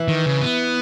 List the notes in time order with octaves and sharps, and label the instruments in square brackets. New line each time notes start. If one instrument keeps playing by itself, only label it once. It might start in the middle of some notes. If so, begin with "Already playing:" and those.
Already playing: [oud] E3
[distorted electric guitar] D#3
C#3
B3